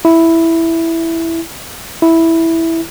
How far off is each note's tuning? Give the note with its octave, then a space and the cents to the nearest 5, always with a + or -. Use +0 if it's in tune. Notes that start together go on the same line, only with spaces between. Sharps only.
E4 +0
E4 -5